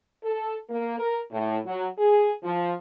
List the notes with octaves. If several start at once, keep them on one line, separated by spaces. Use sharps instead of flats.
A4
A#3
A#4
A2
F#3
G#4
F3